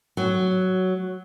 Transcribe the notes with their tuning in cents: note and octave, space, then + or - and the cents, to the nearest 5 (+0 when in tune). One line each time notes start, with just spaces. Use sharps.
F#3 +5